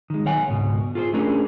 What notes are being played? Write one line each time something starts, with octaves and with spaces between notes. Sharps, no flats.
D#3 G#3
B1 B2 C#5 F#5 G#5
C#2 G#2 B2
F4 G#4 A4 C5
A3 C#4 D4 G#4 A#4